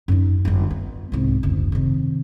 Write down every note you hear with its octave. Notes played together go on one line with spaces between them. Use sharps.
F#2 D#4
G1 F#2
B3
C2 G#2
F#1 D2
C3 D#3